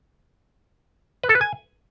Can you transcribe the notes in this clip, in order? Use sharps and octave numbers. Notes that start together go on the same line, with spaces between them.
B4
A4
B4
G#5